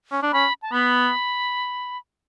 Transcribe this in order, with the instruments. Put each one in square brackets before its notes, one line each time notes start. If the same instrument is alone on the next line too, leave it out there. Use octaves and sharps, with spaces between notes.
[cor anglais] C#4
D4
[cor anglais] C#4 [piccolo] B5
[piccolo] A5
[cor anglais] B3 [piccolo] B5